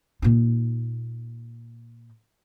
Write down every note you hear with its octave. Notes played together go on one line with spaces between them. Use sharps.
A#2 D#4